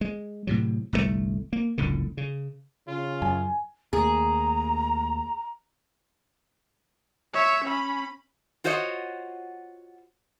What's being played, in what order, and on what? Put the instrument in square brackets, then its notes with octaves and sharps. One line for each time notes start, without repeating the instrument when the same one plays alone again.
[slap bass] G#3
A2 C3 F#3
G1 C2 B2 A3
A#3
F#1 C#2 A2 D3
C#3
[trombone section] C#3 [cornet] F4
[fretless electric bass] F#2 [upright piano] G#5
[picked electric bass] D#2 A3 A#3 [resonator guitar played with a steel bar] G#4 [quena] A#5
[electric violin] C#5 E5
C#4 B5
[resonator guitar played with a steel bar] F4 F#4 C5 C#5 D#5 F#5